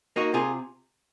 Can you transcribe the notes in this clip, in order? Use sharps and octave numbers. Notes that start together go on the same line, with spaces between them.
A#3 D#4 F#4
C3 F4 G#4